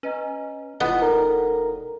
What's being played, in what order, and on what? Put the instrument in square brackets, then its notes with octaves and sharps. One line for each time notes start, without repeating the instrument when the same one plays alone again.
[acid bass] C#4 [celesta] B4 D#5 A#5
[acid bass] E1 [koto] B3 [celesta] E4 F4 D#5
[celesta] D#4 A4 D5 [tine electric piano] A#4 A#5